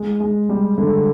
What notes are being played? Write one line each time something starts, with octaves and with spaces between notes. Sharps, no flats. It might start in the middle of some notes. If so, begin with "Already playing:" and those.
Already playing: G#3
G#3
G3
D3